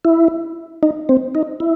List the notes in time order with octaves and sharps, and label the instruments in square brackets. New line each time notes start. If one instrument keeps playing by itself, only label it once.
[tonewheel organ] E4
D#4
C4
D#4
E4